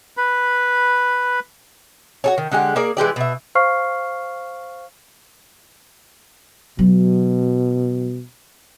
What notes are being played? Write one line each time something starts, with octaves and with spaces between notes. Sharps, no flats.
B4 B5
F#4 A4 C#5
D#3
D3 G#3 G4 F#5
A#3 G#4 A#4 D5
E3 G#3 G4 D5
B2 E5
C5 F5 C#6 F6 C7
B2 F#3